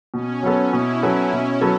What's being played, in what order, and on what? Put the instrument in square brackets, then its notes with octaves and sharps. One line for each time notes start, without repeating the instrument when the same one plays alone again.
[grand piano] B2 [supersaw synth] C#4
[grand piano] F#3 B3 A4
[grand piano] B2 [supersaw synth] E4
[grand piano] F#3 B3 A4
[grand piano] B2 [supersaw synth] C#4
[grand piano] F#3 B3 A4